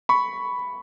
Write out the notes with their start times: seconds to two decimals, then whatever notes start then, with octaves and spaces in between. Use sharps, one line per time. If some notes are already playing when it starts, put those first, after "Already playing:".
0.09 B5 C#6